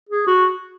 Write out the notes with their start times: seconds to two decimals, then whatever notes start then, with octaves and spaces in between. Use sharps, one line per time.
0.10 G#4
0.27 F#4